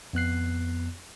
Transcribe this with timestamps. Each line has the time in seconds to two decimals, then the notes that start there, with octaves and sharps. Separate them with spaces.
0.13 F2 B3 F#6 C7